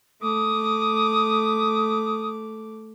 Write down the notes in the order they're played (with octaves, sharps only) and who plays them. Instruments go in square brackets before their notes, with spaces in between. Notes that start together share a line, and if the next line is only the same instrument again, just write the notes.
[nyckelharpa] A3 D6 [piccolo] D#6